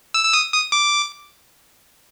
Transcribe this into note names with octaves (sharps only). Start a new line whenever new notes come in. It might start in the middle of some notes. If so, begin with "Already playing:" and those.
E6
E6
D#6
D#6
D6